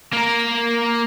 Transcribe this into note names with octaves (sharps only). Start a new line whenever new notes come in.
A#3 A#4